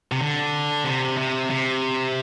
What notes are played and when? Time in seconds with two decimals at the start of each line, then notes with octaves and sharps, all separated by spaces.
0.12 C3
0.20 D3
0.85 C3
1.17 C3
1.51 C3